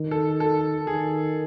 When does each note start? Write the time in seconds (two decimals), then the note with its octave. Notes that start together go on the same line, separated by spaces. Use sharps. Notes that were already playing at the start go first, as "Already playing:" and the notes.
Already playing: D#3
0.11 A4
0.40 A4
0.87 D#3 G#4